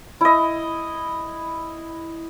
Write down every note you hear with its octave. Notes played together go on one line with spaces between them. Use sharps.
E4 D#5